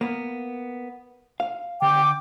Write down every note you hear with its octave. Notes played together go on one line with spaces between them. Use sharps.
A#3 B3
F5
D3 G5 D6